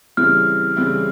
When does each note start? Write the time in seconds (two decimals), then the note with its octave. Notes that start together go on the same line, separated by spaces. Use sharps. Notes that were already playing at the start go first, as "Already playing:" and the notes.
0.17 C#3 E3 G3 C4 E4 F6
0.76 C#3 E3 G3 C4 E4